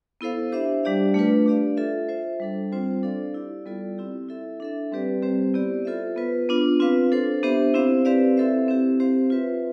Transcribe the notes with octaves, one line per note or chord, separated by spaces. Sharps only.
B3 E4 A4 C5 F5
D4 G4 C5 E5
G3 D4 G4 D5 F5
A3 D4 F4 B4
D4 G4 D5 F5
F4 A4 E5
F4 C5 E5
G3 D4 A4
G3 C4 F4 C5
D4 A4 D5 F5
E4 G4 D5
G3 B3 F4 A4 D5
C4 E4 G4
E4 A4 E5
D4 A4 E5
G3 C4 G4 B4 D5
G3 C4 G4 C5
B3 E4 G4 D5
F4 A4 C5 E5
B3 F4 B4
B3 D4 F4
C4 F4 B4 F5
D4 A4 C5
B3 D4 G4 C5 E5
C4 E4 G4 C5 F5
C4 G4 B4 D5 F5
C4 E4 A4 C5 E5
C4 E4 G4
C4 G4 C5 F5
F4 B4 E5